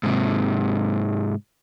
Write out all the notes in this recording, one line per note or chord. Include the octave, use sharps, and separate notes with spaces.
G#2 C3